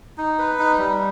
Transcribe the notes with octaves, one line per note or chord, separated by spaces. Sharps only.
D#4
B4
D#4
G3